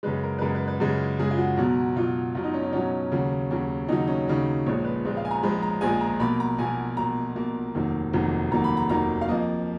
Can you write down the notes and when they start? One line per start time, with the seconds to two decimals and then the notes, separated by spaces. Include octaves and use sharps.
0.03 F#2 C#3 G#3 B4
0.23 A#4
0.39 B4
0.41 F#2 C#3 G#3 A#4
0.55 B4
0.68 B4
0.80 F#2 C#3 G#3
1.19 F#2 C#3 G#3 G#4
1.31 F4
1.38 F#4
1.57 B1 B2 F#3
1.96 B1 B2 F#3 F4
2.35 B1 B2 F#3 F4
2.44 D#4
2.54 C#4
2.63 D#4
2.73 B1 B2 F#3 C#4
3.12 D#2 C#3 F#3
3.51 D#2 C#3 F#3
3.88 D#2 C#3 F#3 D#4
4.08 C#4
4.27 D#2 C#3 F#3 D#4
4.66 A#1 A#2 F3 G#3 C#5
4.85 B4
5.05 A#1 A#2 F3 G#3
5.17 F5
5.25 G#5
5.31 A#5
5.43 A#1 A#2 F3 G#3 B5
5.63 A#5
5.81 A#1 A#2 F3 G#3 G#5
6.01 A#5
6.20 B1 B2 A#3 B5
6.40 A#5
6.58 B1 B2 A#3 G#5
6.97 B1 B2 A#3 A#5
7.36 B1 B2 A#3
7.75 F1 D#2 D#3 F#3 A#3
8.13 F1 D#2 D#3 F#3 A#3
8.51 F1 D#2 D#3 F#3 A#3 A#5
8.64 B5
8.77 A#5
8.89 F1 D#2 D#3 F#3 A#3 A#5
9.21 F5
9.28 F2 F3 A#3 D#5